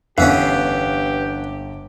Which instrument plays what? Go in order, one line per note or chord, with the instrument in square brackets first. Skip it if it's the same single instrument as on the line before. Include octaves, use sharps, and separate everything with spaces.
[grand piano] G1 G2 [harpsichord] E3 B3 C#4 [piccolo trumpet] G4 [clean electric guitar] B4 F5